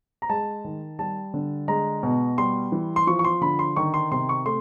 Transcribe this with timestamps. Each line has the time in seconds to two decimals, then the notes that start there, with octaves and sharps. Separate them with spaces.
0.22 A#5
0.29 G#3 A5
0.64 D#3
0.99 G3 A5
1.34 D3
1.68 G#3 A#5
2.03 B2
2.38 G3 C6
2.72 E3
2.96 C6
3.07 F3 C#6
3.19 C#6
3.24 C6
3.41 D3 B5
3.59 C6
3.76 D#3 C#6
3.94 C6
4.11 C3 C6
4.29 C#6
4.46 A3 C6